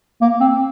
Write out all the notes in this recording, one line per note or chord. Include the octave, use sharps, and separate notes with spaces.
A#3
C4